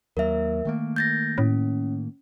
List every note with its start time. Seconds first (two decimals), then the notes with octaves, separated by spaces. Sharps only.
0.17 D#2 F#3 A#3 A#4 E5
0.65 D#3 A3 A#3
0.96 G6 A6 A#6
1.38 A2 C#4